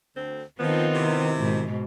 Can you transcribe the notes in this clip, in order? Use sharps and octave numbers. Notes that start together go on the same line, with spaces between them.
D2 C4
D#3 F3 B3 C4 D#4 F4
C3 E4
G#2 B2